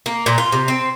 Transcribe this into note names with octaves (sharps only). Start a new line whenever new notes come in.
A#3
A#2
F4
C3
C4